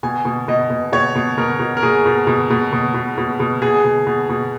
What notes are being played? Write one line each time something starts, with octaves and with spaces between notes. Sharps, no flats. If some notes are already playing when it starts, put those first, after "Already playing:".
B2 G#5
B2
B2 D#5
B2
B2 C#5
B2
B2 A#4
B2
A#4
B2 G#4
B2
B2
B2
B2
B2
B2
B2
B2 G#4
B2
B2
B2